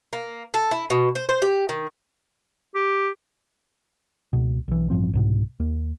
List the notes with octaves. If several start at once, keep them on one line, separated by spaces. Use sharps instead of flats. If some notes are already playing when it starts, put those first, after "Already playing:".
A#3
A4
E4
B2
C5
C5
G4
D#3
G4
C#2 B2
B1 E3
A1 G2 F3 C4
C2 G#2 B2
D#2 A#3